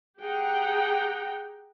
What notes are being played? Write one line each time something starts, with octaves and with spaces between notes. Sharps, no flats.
G4 G#4 F#5 G5 A#5